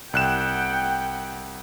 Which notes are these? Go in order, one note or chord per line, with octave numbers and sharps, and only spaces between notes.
C2 F#5 G5 F#6 E7